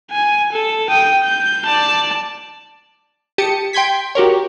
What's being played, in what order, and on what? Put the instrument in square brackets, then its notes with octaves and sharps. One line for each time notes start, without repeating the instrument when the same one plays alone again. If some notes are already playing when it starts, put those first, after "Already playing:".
[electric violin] G#5
A4
G5 D#6
G6
D5 A5
[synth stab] G4 A5 D#6 C#7
G5 C6 G6 G#6 B6
F#4 G4 A#4 C#5